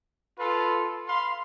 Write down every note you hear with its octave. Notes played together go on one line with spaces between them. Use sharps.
F4 A4 B4
F5 B5 C6